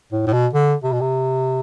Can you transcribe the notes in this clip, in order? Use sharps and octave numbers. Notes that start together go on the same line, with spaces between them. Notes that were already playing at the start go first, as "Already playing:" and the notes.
A2
A2
B2
D3
C3
B2
C3